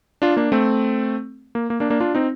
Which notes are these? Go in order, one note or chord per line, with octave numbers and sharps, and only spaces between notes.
D4 F4
A#3 D4
A3 C4
A#3
A#3
A#3 D4
A#3 D4
D4 F4
C4 D#4